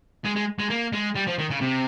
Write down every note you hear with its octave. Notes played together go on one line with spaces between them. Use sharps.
G#3
G#3
G#3
A#3
G#3
G3
F3
D#3
C#3
C3